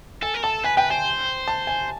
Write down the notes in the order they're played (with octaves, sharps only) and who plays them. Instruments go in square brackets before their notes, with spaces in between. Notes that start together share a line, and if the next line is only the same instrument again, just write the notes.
[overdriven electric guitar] A4 [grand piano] G#5
[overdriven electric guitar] A#4
[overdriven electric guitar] A4 [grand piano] A5
[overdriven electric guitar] B4 [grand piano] G#5
[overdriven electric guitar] B4 [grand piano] G5
[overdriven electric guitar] C5 [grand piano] G#5
[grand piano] A5
G#5